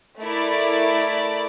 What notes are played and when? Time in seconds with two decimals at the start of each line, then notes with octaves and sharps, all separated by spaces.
0.20 A3 E4 A#4 D5